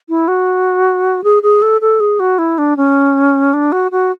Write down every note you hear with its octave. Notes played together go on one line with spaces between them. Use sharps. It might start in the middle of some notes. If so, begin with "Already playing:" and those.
E4
F#4
G#4
G#4
A4
A4
G#4
F#4
E4
D4
C#4
D4
F#4
F#4